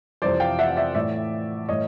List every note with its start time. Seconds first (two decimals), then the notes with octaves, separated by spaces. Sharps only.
0.22 F2 C3 E3 C5 D5
0.40 F5 G5
0.59 E5 F#5
0.76 D5 E5
0.95 A2 E3 D5 E5
1.69 A2 E3 C#5 D#5